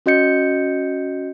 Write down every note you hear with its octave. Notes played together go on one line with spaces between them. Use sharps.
C#4 F#4 D#5 G6 C#7